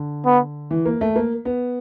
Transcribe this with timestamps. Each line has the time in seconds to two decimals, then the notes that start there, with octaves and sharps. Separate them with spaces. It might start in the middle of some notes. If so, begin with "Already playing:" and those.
Already playing: D3
0.25 B3
0.71 E3
0.86 A#3
1.01 A3
1.16 A#3
1.45 B3